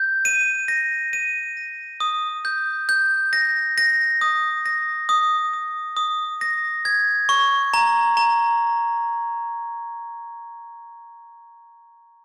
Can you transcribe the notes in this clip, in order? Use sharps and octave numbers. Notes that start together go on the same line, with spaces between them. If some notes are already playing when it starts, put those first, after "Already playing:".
Already playing: G6
D#7
A#6
D#7
A#6
D#6
G6
G6
A#6
A#6
D#6
A#6
D#6
D#6
D#6
A#6
G#6
C#6
A#5
A#5